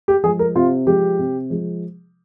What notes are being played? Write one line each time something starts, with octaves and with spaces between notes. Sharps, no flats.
G4
F3 G#3 G#4
A#4
C3 F4
F3 G#3 G4
C3
F3 G#3